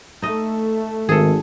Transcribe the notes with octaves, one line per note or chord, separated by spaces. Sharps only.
A3 D#4 D#5
G#1 D#3 G#4 A4